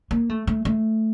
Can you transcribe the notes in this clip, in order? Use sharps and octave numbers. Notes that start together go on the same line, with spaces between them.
A#3
A3
A3
A3